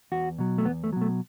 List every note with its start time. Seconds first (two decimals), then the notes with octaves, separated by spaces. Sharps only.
0.12 E2 F#4
0.38 B2 F#3
0.58 A3
0.65 E2 B3
0.84 A3
0.93 B2 F#3
1.01 A3